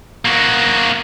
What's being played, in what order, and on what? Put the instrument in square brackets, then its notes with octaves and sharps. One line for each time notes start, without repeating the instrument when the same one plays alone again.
[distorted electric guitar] A#3 F#4